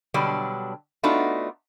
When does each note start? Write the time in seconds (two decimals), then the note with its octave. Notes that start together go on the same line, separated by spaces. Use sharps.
0.14 B2 D3 F#3 G3 D4
1.03 A3 B3 D4 D#4 F4 F#4